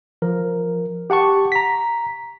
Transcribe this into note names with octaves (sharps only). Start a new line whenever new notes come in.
F3 A#4
G4 F#5 A5 C#6
A#5 B6